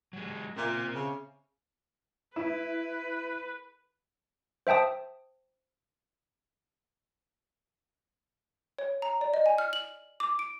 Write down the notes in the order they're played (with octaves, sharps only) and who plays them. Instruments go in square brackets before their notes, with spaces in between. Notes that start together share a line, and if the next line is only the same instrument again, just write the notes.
[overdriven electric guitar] F#3 G#3
[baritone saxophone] A#2 [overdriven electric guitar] C4 E5
[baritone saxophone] C#3
[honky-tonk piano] E4 [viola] B4
[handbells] C5 E5 G5 A5 D#6
[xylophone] C#5
A#5
D5
D#5
G#5
F6
F#7
D6
D7